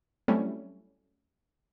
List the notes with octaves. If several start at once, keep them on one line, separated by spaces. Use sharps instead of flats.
F#3 G3 A3 C4 C#4 E4